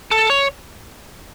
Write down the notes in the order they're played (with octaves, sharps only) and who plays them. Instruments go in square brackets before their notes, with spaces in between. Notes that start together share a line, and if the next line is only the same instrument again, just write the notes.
[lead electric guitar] A4
C#5